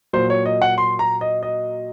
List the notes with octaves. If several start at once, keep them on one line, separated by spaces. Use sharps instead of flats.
A#2 F#3 A#3 C5
C#5
D#5
F#5
C6
A#5
D#5
D#5